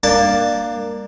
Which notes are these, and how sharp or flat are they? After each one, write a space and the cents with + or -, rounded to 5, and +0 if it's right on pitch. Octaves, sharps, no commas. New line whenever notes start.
A#3 +0 D4 +20 A5 +0